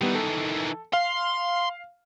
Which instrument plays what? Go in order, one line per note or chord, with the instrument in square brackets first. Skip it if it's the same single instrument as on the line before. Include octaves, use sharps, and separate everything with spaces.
[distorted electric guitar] D#3 E3 [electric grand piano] G3 B3
[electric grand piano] A4
[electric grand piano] F5 [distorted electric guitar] C6